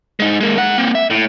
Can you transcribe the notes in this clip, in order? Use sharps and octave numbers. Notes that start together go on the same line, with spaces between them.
G#3 D#4
G#3 A#3
G#3 F#5
A#3 C4
E5
A2